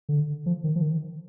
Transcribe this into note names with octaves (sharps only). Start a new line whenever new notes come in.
D3
F3
D#3
F3
D#3